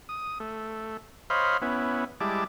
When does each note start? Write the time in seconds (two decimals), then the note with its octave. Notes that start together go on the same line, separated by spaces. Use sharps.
0.09 D#6
0.40 A3
1.30 C5 C#5 D#5 F5 B5 C6
1.62 B3 C#4 E4
2.21 G3 G#3 E4 A5 D6